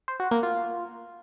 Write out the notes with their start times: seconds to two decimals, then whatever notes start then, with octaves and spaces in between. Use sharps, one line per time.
0.08 C5
0.20 F#4
0.31 A#3
0.43 F4